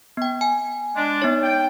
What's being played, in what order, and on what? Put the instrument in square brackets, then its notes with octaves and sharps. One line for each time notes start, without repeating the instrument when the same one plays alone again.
[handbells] B3 G5
G#5
[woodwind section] G#3 D4
[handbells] B3 D#4 C#5
[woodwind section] G5